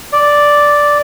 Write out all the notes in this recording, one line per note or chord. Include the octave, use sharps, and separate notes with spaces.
D5